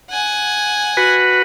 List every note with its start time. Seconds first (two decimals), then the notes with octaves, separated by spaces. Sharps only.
0.10 F#5 G#5
0.97 F#4 B4